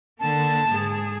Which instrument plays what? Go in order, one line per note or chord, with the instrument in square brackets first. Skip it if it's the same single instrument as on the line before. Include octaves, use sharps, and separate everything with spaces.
[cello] D3 A#3 [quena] A5
[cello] G#2 G#4